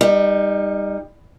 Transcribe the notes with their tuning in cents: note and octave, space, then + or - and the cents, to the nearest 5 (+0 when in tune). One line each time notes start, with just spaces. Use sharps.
G3 +25 D#4 +0